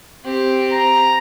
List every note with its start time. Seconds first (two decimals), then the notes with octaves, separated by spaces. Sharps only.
0.24 C4 G4
0.72 A#5